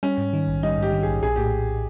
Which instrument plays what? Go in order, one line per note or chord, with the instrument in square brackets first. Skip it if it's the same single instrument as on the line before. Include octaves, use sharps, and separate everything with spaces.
[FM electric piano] G3 [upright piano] C#4
[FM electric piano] G#2
D#3
A#1
[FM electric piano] G3 [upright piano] D#4
[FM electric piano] G#2 [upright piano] G4
[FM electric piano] D#3
[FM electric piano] A#1 [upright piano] G#4
[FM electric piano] A#1 [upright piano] G#4
[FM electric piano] A2 [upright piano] G4